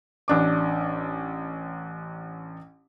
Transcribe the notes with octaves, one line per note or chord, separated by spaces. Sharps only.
A1 D4 D6